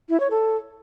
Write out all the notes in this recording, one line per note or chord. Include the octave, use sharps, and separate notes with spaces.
E4
C#5
A4